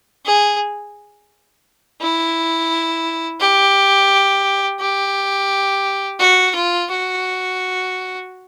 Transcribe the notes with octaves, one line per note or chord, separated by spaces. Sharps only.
G#4
E4
G4
G4
F#4
F4
F#4